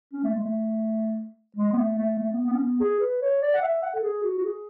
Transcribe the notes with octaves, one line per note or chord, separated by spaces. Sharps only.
C#4
A3
G#3
A3
G#3
B3
A3
A3
A3
B3
B3
C#4
B3
G#4
B4
C#5
D5
F#5
E5
F#5
A4
G#4
F#4
F#4
G#4